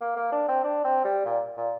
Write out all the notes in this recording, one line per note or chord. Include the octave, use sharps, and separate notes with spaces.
A#3
A#3
D4
C4
D4
C4
G3
A#2
A#2